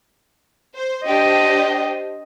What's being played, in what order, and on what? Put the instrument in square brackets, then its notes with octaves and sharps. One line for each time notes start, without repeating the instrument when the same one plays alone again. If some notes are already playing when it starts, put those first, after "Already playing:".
[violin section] C5
[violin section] D4 G4 C5 [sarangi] D#5